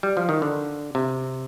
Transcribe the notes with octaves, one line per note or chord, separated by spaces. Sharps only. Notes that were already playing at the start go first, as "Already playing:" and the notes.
G3
F3
D#3
D3
C3